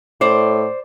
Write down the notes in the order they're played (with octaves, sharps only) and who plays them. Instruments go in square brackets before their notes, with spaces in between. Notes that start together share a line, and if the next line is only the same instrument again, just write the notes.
[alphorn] A2 [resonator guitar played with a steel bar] C5 D5